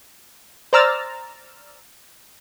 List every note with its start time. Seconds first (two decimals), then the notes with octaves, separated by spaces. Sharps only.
0.73 C5 D5 A#5 E6 F6 A6